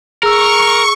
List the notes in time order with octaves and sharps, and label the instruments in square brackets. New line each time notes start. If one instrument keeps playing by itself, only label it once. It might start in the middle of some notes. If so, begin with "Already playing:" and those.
[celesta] G#4 E6 [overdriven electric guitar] A#4 [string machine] C#6